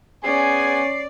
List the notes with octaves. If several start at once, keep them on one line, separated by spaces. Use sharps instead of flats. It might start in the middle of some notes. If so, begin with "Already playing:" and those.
B3 C#4 G#4 D5 G#5 C7